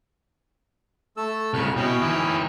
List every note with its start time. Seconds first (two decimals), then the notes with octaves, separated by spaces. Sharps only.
1.17 A3 A4 E6
1.54 C2 C#3 B4 C#6 F6
1.77 B2 C#4 E4 G5
2.02 E3 D#4